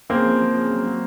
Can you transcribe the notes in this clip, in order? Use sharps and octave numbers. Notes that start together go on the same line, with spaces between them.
C#3 A#3 C4
F3
F3
C#3
F#3
F#3